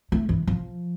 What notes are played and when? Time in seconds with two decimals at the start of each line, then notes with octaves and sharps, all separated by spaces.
0.12 A3
0.29 E3
0.47 F3